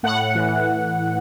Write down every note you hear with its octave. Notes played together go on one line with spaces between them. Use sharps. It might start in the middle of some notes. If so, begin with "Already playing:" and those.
A2 F#5
E3